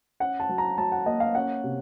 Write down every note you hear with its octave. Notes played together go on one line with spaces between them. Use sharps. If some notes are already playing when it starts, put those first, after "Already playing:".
C#4 F#5
A5
F#3
A#5
F#3 A5
F#5
A#3 D#5
F5
C#4 F#5
C3